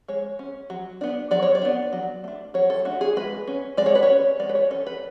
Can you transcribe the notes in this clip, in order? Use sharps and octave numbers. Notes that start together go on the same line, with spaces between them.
G#3 C#5
C#4
F#3
B3 D4
F#3 D5
C#5
D5
B3 D4
F#3
A3 D4
F#3 C#5
A4
A3 D4 F#4
G#4
G#3 B4
C#4
G#3 D5
C#5
B4
C#5
C#4
G#3 D5
B4
C#5
C#4 A4
B4